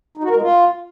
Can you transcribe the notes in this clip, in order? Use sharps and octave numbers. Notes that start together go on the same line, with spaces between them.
D#4
F#4
A#4
G#3
F4